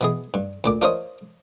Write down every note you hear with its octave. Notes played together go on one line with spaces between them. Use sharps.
B2 E3 G#4
G2
D2 A#2 D6
D4 F4 A#4 C5 C#5 D#5